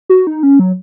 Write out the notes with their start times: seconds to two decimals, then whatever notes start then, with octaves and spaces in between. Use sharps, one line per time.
0.09 F#4
0.27 D#4
0.43 C#4
0.59 F#3